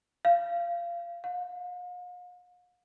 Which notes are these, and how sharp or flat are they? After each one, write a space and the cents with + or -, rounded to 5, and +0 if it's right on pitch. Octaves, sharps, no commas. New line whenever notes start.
F5 -20
F5 +45